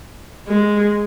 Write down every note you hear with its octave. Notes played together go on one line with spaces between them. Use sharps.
G#3